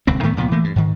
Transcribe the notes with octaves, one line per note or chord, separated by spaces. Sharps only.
D#1 C#2 C4
A2 D#3 A3 B3
C#2 A#2 F3 B3
E3 A3 A#3
G2
G#2 D#3